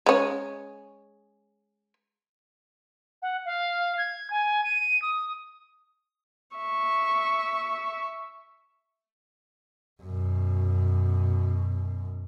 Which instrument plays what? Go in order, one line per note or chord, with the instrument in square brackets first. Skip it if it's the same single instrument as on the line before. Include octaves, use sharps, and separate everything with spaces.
[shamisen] G#3 C#4
[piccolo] F#5
F5
G#6
G#5
D#7
D#6
[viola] E5 C#6
[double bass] F#2 B2